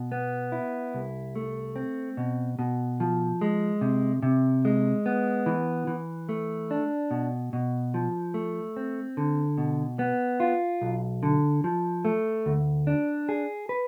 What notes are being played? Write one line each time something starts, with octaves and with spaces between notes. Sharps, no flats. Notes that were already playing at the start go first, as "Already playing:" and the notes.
Already playing: B2
B3
E4
C2
A3
C4
B2
B2
F3
G#3
C3
C3
G#3
B3
E3
E3
A3
D4
B2
B2
F3
A3
C4
D3
B2
B3
F4
B1
D3
F3
A3
D2
D4
G#4
B4